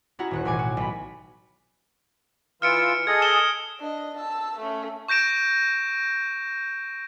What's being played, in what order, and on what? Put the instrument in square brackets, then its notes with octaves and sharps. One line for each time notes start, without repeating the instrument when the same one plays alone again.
[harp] C#4 E4 F#4 G#4 F#5 A#5
D#1 D#2 F#6
A1 B2 E3 G#5 D6
F#4
B1 B5
[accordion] E3 F4 E6 [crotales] F6 C#7 D7
[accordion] G#4 A4 D#5 [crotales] G#6
[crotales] D#6 E7 G7
[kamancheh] D4 D#5
A5 E6
A3 C#4
[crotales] C#6 G6 A#6 D7 E7